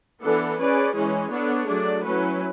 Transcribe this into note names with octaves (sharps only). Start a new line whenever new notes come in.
E3 B3 D4 A4
C#4 G#4 B4 D5
E3 G#3 C#4 G#4
B3 D4 A4 C#5
F#3 A3 D4 G#4 D5
F#3 C#4 E4 B4